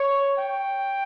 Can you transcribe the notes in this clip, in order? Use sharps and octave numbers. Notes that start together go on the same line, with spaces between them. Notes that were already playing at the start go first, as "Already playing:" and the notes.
Already playing: C#5
G5